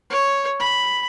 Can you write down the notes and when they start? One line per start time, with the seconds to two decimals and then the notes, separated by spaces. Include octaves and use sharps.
0.11 C#5
0.60 B5